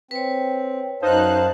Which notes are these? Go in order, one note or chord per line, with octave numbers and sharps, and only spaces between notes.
C4 B4 C#5
F#2 D#4 C5 F5 A5 F#6